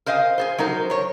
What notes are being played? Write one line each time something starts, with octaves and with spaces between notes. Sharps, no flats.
A#4 C5 D#5 F5 G#5
G#4 A4 C5
F#3 D#4 A#4 C5
A#4 C#5